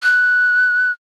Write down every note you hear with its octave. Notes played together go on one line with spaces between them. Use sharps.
F#6